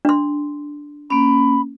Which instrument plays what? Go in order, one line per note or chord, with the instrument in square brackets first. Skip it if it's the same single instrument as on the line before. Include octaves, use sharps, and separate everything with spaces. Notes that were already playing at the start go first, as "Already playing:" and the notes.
[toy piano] D4 C6
[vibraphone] A#3 C#4 [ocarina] B5